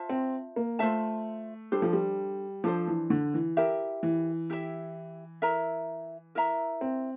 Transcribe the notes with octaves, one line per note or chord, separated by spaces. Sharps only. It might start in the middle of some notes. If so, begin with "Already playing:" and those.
Already playing: F4 C5 E5 A5
C4
A#3
A3 F4 C5 E5 A5
G3 D4 A4 C5
F3
G3
F3 D4 A4 C5
E3
D3
E3
E4 G4 A#4 E5
E3
E4 G4 A#4 E5
E4 A#4 E5 A#5
E4 A#4 E5 A#5
C4